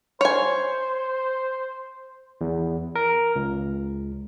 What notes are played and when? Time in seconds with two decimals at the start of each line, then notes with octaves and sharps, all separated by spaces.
0.21 C5 C#5 G#5
2.41 E2
2.96 A#4
3.36 C#2